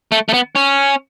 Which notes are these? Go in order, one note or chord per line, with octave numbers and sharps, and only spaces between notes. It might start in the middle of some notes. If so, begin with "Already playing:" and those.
A3
A3
B3
C#4